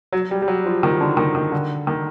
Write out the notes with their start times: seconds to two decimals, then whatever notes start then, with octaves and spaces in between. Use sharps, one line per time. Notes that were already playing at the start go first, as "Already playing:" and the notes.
0.12 F#3
0.31 G3
0.42 G3
0.48 F#3
0.66 F3
0.83 D#3
1.01 D3
1.17 D#3
1.35 D#3
1.52 D3
1.87 D#3